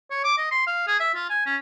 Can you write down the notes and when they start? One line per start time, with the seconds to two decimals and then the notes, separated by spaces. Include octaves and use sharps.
0.11 C#5
0.24 D6
0.38 D#5
0.51 C6
0.67 F5
0.87 G#4
1.00 E5
1.15 F4
1.30 G#5
1.46 C#4